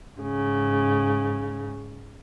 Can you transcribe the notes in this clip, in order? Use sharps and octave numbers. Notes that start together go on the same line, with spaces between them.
G#2 C#3